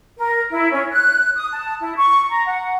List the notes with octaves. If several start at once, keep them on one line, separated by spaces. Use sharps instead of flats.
A#4
E4
C#4
F#6
D#6
A5
E4
C#6
A#5
F#5